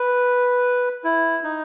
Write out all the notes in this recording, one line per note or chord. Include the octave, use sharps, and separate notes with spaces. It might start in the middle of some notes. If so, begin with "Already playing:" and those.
Already playing: B4
E4
D#4